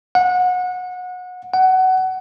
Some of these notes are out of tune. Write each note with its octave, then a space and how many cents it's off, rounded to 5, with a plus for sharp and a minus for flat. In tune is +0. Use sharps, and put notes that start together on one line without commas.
F#5 -25
F#5 +20